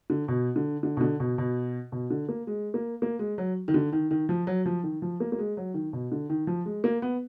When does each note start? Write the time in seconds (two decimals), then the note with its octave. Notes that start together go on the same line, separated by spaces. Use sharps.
0.10 D3
0.28 B2
0.56 D3
0.83 D3
0.97 B2
1.01 D3
1.20 B2
1.38 B2
1.92 B2
2.10 D3
2.29 A#3
2.47 G#3
2.74 A#3
3.02 A#3
3.19 G#3
3.38 F#3
3.68 D#3
3.74 D3
3.93 D#3
4.11 D#3
4.29 F3
4.47 F#3
4.66 F3
4.84 D#3
5.02 F3
5.20 A#3
5.32 A#3
5.39 G#3
5.57 F#3
5.74 D#3
5.93 B2
6.12 D3
6.30 D#3
6.47 F3
6.66 G#3
6.84 A#3
7.02 B3